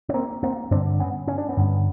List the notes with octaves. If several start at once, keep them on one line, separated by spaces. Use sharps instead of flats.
C#4
A#3 C4
A#3 C4
G2 D3 C4 D4
B3 C#4
C#4
D4
B3 C#4
G2 D3